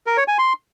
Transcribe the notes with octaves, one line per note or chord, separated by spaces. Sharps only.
A#4
C#5
G#5
C6